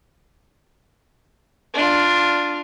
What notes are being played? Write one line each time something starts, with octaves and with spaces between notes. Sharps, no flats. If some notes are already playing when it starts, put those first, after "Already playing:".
D4 F4